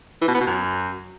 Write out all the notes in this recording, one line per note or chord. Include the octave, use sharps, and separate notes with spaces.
E3
B2
B3
B2
F#2